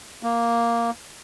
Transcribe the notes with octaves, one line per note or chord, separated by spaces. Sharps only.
A#3